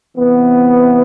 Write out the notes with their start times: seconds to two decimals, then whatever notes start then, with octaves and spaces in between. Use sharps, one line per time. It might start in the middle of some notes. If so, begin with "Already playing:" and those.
0.17 C3 E3 B3